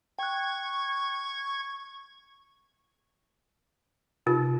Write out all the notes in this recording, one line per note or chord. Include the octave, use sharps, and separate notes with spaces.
G5 C#6 F#6 G#6
C3 D#4 F4 A#4 A6